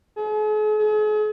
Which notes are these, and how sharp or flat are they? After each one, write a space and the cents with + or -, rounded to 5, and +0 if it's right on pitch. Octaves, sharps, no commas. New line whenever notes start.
G#4 +45
G#4 +40